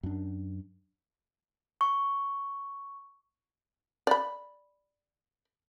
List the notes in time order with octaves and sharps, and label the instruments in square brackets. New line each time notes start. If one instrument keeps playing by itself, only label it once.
[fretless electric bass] F#2 D4
[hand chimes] C#6
[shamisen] D5 B5